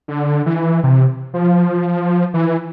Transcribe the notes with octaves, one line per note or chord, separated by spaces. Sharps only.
D3
E3
C3
F3
E3